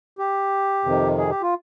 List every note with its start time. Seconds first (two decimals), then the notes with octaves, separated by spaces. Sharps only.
0.19 G4
0.85 F2 C3 D#3
1.18 G#4
1.30 G4
1.42 F4